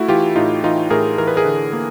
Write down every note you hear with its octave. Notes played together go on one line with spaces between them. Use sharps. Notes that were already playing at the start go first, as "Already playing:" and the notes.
Already playing: A3 E4 F#4
E3 F4 G4
A2 D#4 F4
E3 D#4 F4
A2 G#4 A#4
E3 A#4
B4
G#4 A#4
D3
A#3